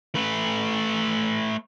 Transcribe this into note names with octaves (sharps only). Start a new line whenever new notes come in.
A3 B4